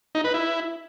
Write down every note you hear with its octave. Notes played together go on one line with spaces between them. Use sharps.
D#4
B4
E4